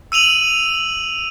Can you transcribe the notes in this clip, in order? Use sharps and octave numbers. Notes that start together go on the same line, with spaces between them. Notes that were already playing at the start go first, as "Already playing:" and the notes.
E6 D#7 F7 F#7